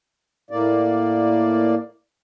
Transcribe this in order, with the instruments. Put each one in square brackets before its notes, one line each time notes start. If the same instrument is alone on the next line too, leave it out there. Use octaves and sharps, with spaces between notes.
[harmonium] A2 A#3 D5